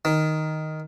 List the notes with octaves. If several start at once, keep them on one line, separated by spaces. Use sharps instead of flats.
D#3